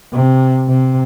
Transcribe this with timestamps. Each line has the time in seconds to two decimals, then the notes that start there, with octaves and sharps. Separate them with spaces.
0.12 C3
0.68 C3